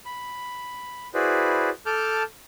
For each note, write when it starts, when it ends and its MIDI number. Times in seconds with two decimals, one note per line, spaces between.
0.05 1.08 83
1.14 1.70 64
1.14 1.70 66
1.14 1.70 68
1.14 1.70 71
1.14 1.70 72
1.14 1.70 74
1.86 2.23 69
1.86 2.23 81
1.86 2.23 86
1.86 2.23 89
1.86 2.23 91